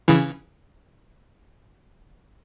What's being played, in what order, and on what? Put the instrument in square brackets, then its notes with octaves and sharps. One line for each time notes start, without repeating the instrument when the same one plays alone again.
[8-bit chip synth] C#3 E3